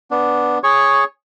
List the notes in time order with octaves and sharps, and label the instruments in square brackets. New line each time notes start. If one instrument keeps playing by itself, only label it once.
[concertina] B3 D4
G#4 C#5 C#6